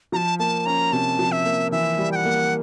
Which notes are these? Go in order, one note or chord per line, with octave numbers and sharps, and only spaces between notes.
F3 A5 A#5
A#3 A5
C#4 A#5
C3 A5
F3
E5
A#3
E3 E5
G3
G5
F#5
A#3